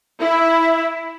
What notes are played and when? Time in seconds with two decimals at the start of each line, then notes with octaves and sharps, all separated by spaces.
0.20 E4 E5